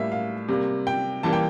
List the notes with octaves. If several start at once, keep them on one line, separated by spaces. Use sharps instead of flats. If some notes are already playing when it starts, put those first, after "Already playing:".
Already playing: A2 G3 A#3 E5 F5
F5
C3 G3 A#3
G5
E3 G3 A#3 A5
G5